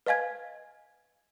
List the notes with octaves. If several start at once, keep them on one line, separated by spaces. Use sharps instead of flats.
B4 D#5 F5 G#5 G#6